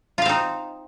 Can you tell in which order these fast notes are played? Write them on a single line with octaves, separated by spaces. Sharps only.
F4 F5 C4 D#4